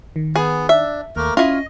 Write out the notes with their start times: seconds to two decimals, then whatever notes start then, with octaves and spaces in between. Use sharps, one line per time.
0.16 D#3
0.36 B3 G#4
0.69 D4 E5
1.16 D#2 A3 A#3 A#4
1.37 C#4 E4 F4 C#5 D#5